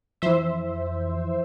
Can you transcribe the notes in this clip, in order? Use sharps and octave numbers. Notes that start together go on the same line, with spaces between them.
F2 E3 C5 E5